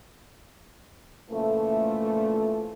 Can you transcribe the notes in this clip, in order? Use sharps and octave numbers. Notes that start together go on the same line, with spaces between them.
A#2 C#3 E3 F3 A3